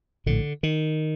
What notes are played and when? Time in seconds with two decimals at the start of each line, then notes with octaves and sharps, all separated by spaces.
0.26 A#1 A2 D3
0.63 D#3